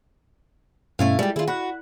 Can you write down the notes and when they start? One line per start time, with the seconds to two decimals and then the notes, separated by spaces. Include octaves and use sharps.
0.99 G2 B2 A3 C#4 E4 F5
1.19 G3 G#3 F4 G4 G#4
1.36 D#3 E4 F4 G#4
1.48 F#4 F#5 B5 F#6